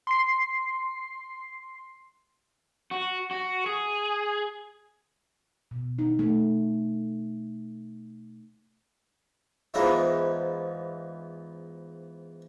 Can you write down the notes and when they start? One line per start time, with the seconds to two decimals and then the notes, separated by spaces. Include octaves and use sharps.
0.07 C6 C7
2.91 F#4
3.31 F#4
3.66 G#4
5.71 B2
5.99 D#4
6.19 A3
9.74 E2 G#2 F3 D#4 E4